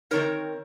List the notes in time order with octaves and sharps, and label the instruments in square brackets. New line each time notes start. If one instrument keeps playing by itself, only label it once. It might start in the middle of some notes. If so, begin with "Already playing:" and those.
[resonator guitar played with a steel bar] D#3 F#3 C4 D#4 A#4 C#5